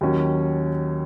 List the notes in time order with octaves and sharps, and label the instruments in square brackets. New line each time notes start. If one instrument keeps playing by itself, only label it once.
[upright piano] D#2 D#3 F#3 C#4